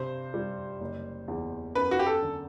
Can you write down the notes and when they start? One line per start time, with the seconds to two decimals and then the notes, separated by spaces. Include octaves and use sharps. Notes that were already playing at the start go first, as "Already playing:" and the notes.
Already playing: G2 C3 C5
0.34 G3
0.80 F#1
1.28 E2
1.75 F#2 B4
1.91 F#4
1.99 G4
2.06 A4
2.22 D3